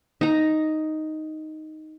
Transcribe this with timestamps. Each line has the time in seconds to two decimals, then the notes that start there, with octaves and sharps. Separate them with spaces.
0.21 D#4 A#5